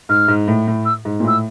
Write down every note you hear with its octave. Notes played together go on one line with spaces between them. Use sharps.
G#2 F6
G#2
A2
A2
E6
G#2
A#2
A2 E6